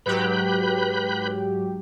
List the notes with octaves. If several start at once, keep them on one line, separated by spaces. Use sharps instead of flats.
G#2 F#3 G4 B4 B5 G6